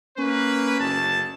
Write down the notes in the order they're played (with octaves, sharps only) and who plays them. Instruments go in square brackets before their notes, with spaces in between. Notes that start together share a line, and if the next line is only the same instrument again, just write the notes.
[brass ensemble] A#3 B4 [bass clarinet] C#4
[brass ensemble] F#1 D2 A5